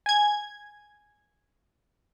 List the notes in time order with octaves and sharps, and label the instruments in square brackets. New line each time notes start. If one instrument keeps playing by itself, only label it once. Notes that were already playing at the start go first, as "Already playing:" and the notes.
[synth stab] G#5 G#6